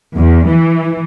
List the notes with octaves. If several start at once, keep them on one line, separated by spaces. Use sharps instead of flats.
E2
E3